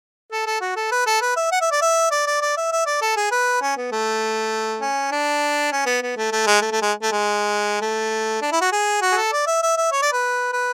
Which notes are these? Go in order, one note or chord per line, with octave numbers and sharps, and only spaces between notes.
A4
A4
F#4
A4
B4
A4
B4
E5
F#5
E5
D5
E5
D5
D5
D5
E5
E5
D5
A4
G#4
B4
C#4
B3
A3
C#4
D4
C#4
B3
B3
A3
A3
G#3
A3
A3
G#3
A3
G#3
A3
D4
E4
F#4
G#4
F#4
G#4
A4
D5
E5
E5
E5
C#5
D5
B4
B4